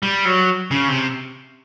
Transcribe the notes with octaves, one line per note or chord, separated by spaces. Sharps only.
G3
F#3
C#3
C3